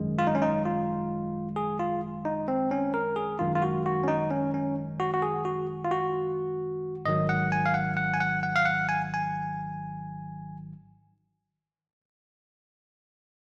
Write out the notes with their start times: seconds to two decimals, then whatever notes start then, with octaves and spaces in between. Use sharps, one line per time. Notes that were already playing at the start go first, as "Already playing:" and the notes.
Already playing: G#1 F#2 D#3 G#3
0.18 F4
0.27 D#4
0.35 C#4
0.42 D#4
0.65 F4
1.56 G#4
1.79 F4
2.25 D#4
2.48 C4
2.71 C#4
2.94 A#4
3.16 G#4
3.39 G#1 F#2 D#3 G#3 F4
3.55 F4
3.62 F#4
3.86 F#4
4.03 C#4
4.08 D#4
4.31 C#4
4.54 C#4
5.00 F#4
5.14 F#4
5.22 G#4
5.45 F#4
5.85 F4
5.91 F#4
7.05 G#1 G#2 D#3 F#3 D#5
7.29 F#5
7.52 G#5
7.66 F5
7.74 F#5
7.97 F#5
8.14 G#5
8.20 F#5
8.43 F#5
8.56 F5
8.65 F#5
8.89 G#5
9.14 G#5